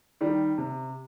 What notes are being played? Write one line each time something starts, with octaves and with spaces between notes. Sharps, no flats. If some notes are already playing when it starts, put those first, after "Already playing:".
D#3 G3
C3